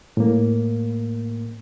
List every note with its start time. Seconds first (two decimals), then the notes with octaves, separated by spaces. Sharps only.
0.17 A2 A#3